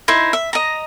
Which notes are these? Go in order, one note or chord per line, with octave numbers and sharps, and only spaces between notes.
D#4 E4 C5 E5
E5
D#5 A#5